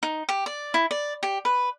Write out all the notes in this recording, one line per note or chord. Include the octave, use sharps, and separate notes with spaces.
D#4
G4
D5
E4
D5
G4
B4